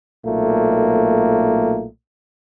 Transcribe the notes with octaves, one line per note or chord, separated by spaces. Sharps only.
B1 A#2 A3 A#3